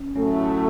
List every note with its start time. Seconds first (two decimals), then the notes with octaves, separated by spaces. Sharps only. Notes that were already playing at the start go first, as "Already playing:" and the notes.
Already playing: C#4
0.15 A2 F#3 A3 C#4